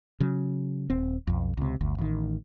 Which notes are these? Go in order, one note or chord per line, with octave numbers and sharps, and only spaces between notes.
C#3 F#3
D#1 C4
B1 F2
C#2 C3
G1 D2
A1 D#3